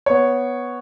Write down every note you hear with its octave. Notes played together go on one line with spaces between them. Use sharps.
B3 C#5